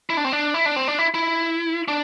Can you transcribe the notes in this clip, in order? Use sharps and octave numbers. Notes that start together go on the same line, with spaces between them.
E4
D4
C4
D4
E4
D4
C4
D4
E4
E4
D4